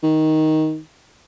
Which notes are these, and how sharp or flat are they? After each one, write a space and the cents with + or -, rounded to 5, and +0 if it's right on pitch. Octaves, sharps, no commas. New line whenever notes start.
D#3 +10